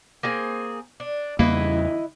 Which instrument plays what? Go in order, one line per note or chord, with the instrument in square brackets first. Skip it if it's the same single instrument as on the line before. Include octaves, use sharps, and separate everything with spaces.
[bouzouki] A#3 C4 G#4
D4
[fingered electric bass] E2 C#3 G3 [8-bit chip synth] A#3 [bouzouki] E4 B4 D#5